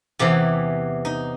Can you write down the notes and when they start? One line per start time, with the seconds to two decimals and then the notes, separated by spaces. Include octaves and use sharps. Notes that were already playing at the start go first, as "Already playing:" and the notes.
0.19 E2 C3 E3 G4
1.05 D#4